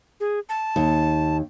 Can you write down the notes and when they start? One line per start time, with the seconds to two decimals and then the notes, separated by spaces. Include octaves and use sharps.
0.20 G#4
0.49 A5
0.76 D#2